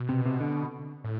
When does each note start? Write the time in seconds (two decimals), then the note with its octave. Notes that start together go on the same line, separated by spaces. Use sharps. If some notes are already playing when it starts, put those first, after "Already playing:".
Already playing: B2
0.09 C3
0.25 C3
0.40 D3
1.04 A2